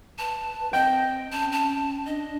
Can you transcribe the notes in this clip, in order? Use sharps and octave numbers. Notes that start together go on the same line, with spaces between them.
B4 A5
C4 D#5 G5
C#4 A5
A5
D4 D#5